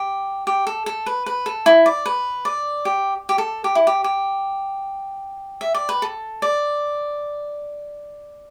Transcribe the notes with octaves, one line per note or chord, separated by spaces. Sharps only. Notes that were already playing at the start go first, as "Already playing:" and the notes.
Already playing: G4
G4
A4
A4
B4
B4
A4
E4
D5
B4
D5
G4
G4
A4
G4
E4
G4
G4
E5
D5
B4
A4
D5